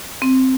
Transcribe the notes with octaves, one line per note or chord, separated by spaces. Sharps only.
C4